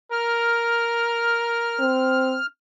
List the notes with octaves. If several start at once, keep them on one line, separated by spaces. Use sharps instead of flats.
A#4 F6
C4